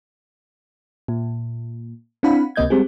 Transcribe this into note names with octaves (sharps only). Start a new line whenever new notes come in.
A#2
C4 D4 E4 F5 F#5 B5
C#2 C3 A#3 D#5 G6 G#6
G3 G#3 C4 G4 G#4